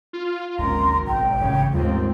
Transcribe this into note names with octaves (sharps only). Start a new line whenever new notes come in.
F4
D1 G#1 C#4 A#4 C6
B1 G5
A1 A2 C#3
D#2 G#2 G3 A3 C4 F4